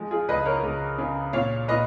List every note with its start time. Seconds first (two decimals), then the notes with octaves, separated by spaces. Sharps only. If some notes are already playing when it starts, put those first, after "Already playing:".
Already playing: F3 G#3
0.11 F4 G#4
0.28 C#2 B4 D#5
0.46 A#4 C#5
0.63 C#2
0.98 C#3
1.33 A#2 C#5 F5
1.68 A#2 B4 D#5